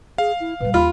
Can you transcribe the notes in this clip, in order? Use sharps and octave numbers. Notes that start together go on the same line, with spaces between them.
G#4 F5
E4
A#2 G3 B4
D#2 F4 B5